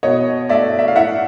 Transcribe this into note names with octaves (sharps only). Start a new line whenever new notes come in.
B2 C#5 D#5
A3 D5 E5
E5
F5
A2 E5 F#5